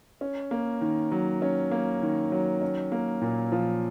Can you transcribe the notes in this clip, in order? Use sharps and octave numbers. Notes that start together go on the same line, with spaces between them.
C#4
A#3
D#3
F#3
C#4
A#3
D#3
F#3
C#4
A#3
A#2
F3